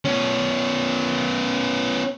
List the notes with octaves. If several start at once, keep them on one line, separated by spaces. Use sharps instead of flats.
B3 C#4